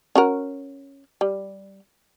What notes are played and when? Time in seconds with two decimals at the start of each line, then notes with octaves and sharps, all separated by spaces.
0.15 C#4 F#4 A#4
1.21 G3